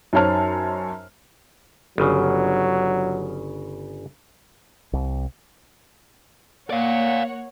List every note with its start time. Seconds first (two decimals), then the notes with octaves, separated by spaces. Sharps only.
0.13 F#2 D#4 C5 C#5 A5 F6
1.98 G1 C#3 F#3
4.93 C2
6.70 A#3 C#5 D5 F5 F#5